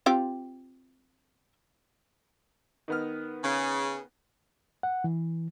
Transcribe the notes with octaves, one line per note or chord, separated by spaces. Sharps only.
C4 F4 G4
D#3 B3 F6
C#3
F#5
E3